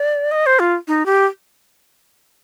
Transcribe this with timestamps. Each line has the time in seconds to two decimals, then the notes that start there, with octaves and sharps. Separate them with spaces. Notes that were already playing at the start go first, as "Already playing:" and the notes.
Already playing: D5
0.32 D#5
0.46 C5
0.59 F4
0.88 D#4
1.06 G4